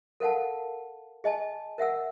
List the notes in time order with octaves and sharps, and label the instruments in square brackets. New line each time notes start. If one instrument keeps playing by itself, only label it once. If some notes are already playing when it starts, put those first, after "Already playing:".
[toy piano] A4 A#4 F5 F#5 A5
G#4 D#5 G#5 A5
A#4 E5 F#5 E6